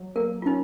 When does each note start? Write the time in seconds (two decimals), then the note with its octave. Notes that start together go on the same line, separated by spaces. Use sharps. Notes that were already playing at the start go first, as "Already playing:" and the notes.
Already playing: F#3
0.16 A#3 A#4
0.42 F4
0.46 C#4 D#4